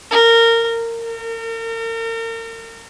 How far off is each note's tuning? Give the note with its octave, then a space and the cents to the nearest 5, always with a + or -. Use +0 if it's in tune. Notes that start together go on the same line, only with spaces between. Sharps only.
A#4 -20
A#4 -40